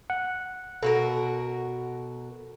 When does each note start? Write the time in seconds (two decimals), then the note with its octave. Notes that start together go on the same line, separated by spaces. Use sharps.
0.10 F#5
0.83 B2 F#4 A4 A#4